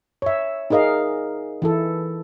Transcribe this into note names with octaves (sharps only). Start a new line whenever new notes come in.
C#5 E5
D#4 G#4 A#4 D#5 F5
E3 E4 A4